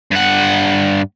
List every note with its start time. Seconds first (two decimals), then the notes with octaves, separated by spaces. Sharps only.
0.11 G2 F#5